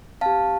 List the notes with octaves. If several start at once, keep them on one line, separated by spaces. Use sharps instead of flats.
C4 G4 F5 A5